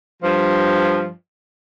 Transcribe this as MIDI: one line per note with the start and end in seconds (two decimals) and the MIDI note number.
0.23 1.09 43
0.23 1.09 53